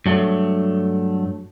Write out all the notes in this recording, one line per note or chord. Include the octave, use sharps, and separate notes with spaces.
G2 F#3 A3